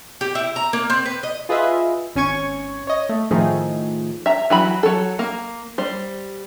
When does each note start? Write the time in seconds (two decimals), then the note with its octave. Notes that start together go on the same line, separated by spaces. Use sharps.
0.21 G4
0.35 E4
0.56 A#5
0.73 A#3
0.90 C4
1.06 B4
1.23 D#5
1.49 F4 G#4 B4 D#5 E5
2.16 G#1 C#4 G#5 C#6 G#6
2.87 C#5 D#5
3.09 A3
3.31 A2 D#3 F3 A3 D#4 G#4
4.26 E5 A#5
4.50 E3 F#3 B5
4.83 F#3 A4
5.19 A#3
5.78 G3 C5